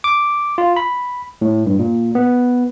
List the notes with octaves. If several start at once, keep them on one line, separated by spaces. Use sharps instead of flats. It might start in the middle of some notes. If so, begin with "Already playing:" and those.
D6
F4
B5
A2
G2
A#2
B3